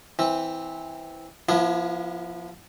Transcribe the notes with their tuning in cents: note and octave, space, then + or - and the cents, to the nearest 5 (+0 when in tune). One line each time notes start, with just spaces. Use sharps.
E3 -10 C4 +0
F3 +0 B3 -35 E4 +30